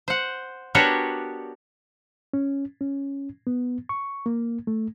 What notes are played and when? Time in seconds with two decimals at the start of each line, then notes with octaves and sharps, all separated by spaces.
0.08 C5 F#5
0.75 B3 D4 F#4 G4 A#4 C#5
2.34 C#4
2.81 C#4
3.47 B3
3.89 C#6
4.26 A#3
4.67 A3